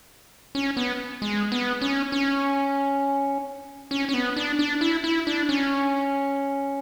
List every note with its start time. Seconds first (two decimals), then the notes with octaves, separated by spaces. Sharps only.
0.55 C#4
0.77 B3
1.22 G#3
1.52 B3
1.81 C#4
2.12 C#4
3.91 C#4
4.09 C#4
4.14 B3
4.36 D4
4.59 D4
4.81 E4
5.04 E4
5.27 D4
5.49 C#4